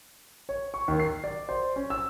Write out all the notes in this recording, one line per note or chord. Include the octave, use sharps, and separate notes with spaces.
C#5
C#6
D#2
C7
D5
C5
C#4
E6